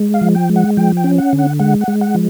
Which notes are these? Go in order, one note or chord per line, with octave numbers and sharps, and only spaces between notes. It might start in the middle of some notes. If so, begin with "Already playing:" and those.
Already playing: G#3
F5
F3
G5
G#3
F#5
F3 G5
G5
C#4
F#5
D3
F#5
G#3 F#5
F#5
G#3
F#5
F3